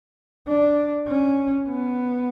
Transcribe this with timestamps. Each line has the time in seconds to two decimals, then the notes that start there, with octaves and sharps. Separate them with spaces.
0.48 D4
1.08 C#4
1.69 B3